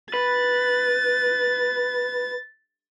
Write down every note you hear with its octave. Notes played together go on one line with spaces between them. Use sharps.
B4 A6